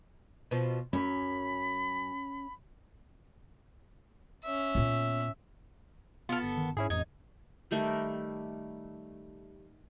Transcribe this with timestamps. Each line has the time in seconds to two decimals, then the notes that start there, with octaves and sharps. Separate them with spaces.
0.51 B2 F3
0.93 F#2 C#4 B5
4.44 C#4 E5
4.75 A#2 B3
6.29 B3 F4 A4 F6
6.43 G1
6.57 D#3
6.77 G#2 C#4 E4 G#4
6.90 A1 F2 D#4 G#6
7.71 D#3 G3 A3 A#4